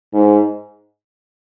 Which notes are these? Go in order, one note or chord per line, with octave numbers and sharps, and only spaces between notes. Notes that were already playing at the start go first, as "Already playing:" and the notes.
G#2